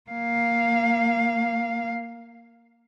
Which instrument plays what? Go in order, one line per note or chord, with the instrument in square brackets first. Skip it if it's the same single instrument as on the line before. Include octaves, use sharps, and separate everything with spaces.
[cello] A#3 F5